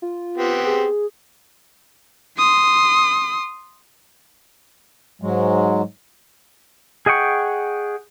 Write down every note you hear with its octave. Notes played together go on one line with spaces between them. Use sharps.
F4
B3 C4 G4
G#4
C6 D#6
G#2 F#3 G#3
G#4 D#5 F#5 G5 C#6